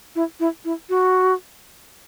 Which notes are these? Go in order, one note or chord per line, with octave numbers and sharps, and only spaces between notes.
E4
E4
E4
F#4